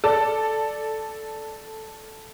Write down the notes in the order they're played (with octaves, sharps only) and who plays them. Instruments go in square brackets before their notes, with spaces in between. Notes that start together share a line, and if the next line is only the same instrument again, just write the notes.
[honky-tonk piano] A4 D5 A5